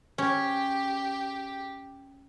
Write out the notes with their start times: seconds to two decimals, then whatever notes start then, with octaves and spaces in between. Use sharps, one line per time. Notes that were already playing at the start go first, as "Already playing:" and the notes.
0.18 C#4 G4